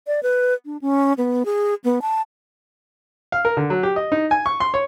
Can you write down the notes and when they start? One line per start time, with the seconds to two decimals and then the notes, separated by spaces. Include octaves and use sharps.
0.07 D5
0.23 B4
0.65 D4
0.81 C#4
1.18 B3
1.45 G#4
1.84 B3
2.02 A5
3.32 F5
3.45 A#4
3.57 D3
3.70 F#3
3.83 G4
3.96 D#5
4.12 D#4
4.31 G#5
4.46 C#6
4.60 C6
4.74 C#5